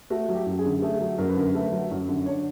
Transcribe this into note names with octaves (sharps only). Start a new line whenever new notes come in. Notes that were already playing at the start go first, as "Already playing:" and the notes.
A3 F#4
F#3
G4
F#2
G#4
D3
A3 G#4
F#3
F#2 A#4
B4
D3 A#4
A3 B4
F#3
F#2
D3
D4 C#5